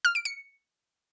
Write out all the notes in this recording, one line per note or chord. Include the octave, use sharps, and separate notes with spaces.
F6
D7
C#7